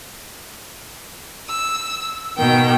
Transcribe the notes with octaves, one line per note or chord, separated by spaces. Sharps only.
E6
B2 D#3 G5